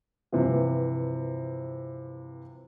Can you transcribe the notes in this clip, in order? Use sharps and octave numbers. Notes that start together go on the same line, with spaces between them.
G2 C3 E3 F3